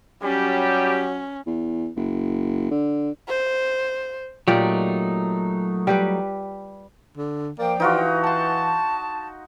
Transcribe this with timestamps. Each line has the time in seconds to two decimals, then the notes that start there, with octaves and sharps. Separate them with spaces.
0.23 F#3 G3 C#4 G4
1.46 E2
1.96 F#1
2.71 D3
3.28 C5
4.48 A#2 F#3 A3 D#4 G4 D5
5.87 G3 G4 B4
7.17 D3
7.59 F3 A#3 D5 G5
7.80 E3 D#4 F4 F#4
8.24 F#5 A5 C6